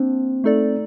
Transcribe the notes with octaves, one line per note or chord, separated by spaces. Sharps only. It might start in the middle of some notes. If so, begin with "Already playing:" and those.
Already playing: A#3 C4 D4
A3 D#4 A4 D5